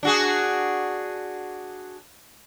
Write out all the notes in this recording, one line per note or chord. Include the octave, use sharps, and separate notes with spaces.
D4 F#4 G#4